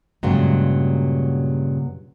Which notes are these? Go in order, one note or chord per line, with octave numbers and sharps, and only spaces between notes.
G2 A#2 C#3 F#3 G#3